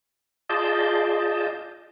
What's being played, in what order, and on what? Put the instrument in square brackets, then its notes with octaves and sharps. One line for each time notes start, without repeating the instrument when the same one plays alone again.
[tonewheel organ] F4 G#4 D5 D#5 A5 G6